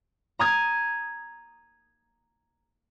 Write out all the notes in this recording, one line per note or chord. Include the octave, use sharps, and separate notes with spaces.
A#5 D#6 G#6